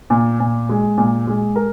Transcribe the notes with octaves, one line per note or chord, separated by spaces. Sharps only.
A#2
A#2
G#3
A#2
G#3
A#4